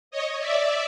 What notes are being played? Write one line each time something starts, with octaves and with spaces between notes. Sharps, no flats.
C#5 D#5
D5 E5